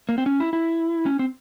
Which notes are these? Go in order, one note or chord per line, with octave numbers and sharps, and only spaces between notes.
A#3
C4
C#4
E4
E4
C#4
C4